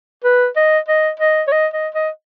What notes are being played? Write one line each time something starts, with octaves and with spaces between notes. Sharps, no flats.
B4
D#5
D#5
D#5
C#5
D#5
D#5
D#5